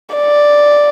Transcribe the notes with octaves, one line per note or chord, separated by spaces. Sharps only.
D5